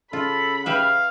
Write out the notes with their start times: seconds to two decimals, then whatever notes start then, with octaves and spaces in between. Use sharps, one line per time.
0.13 C#3 F4 A4 B5
0.66 G4 B4 E5 F5